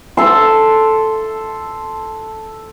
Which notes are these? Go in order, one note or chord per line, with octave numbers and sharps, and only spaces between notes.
A4 C6